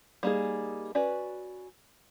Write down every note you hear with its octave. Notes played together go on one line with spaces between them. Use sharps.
G3 A#3 D#4 G#4
C#4 F#4 B4 D5